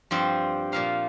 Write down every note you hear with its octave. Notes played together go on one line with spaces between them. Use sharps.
G2 F3 C4
A#2 F3 A#3 F5